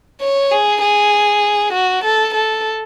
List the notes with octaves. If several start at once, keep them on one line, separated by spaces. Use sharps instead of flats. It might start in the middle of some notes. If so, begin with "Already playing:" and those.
C#5
G#4
G#4
F#4
A4
A4